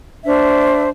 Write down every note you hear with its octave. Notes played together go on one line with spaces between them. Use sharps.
D4 C5 E5